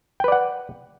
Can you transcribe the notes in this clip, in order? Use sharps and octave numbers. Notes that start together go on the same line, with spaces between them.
B4 D5 F#5 G5